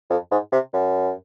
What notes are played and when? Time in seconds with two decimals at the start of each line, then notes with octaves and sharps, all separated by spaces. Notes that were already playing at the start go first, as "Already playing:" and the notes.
0.10 F2
0.31 G#2
0.52 C3
0.73 F#2